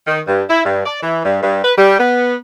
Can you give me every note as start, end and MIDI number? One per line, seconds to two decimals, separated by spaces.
0.07 0.21 51
0.28 0.43 43
0.49 0.62 64
0.65 0.85 43
0.85 1.00 74
1.02 1.20 52
1.24 1.40 43
1.43 1.63 43
1.64 1.73 71
1.78 1.97 55
1.99 2.34 59